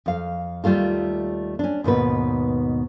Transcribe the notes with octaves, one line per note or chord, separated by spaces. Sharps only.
F2 F5
D#2 G3 A3 F4 A4
C#4 D4
D#2 G#2 B2 B4